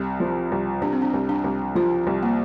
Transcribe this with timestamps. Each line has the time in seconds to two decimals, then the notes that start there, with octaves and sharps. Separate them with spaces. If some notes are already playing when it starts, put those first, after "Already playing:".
Already playing: C2 C4
0.20 F3
0.52 C2
0.82 C2 D4
0.93 C4
1.02 D4
1.14 C2
1.29 D4
1.44 C2
1.75 F3 F4
2.07 C2
2.23 A#3